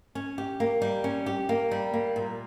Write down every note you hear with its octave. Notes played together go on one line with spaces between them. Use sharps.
C#4
G4
A#3
G3
C#4
G4
A#3
G3
A#3
A#2